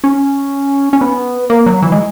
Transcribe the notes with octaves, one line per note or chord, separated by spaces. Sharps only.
C#4
C#4
B3
A#3
F#3
E3
G#3